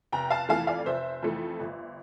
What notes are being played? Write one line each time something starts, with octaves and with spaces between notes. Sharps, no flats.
F1 G5 A#5
F5 A5
F2 E3 A3 F5 A5
D5 F5
D5
F1 C5 E5
F2 E3 A3
G1